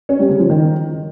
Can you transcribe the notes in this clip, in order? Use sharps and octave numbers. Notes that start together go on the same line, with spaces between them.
C#4
G3
C#3
F3
D#3